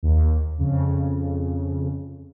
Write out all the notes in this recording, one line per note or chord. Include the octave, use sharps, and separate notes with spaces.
D#2
F2 C#3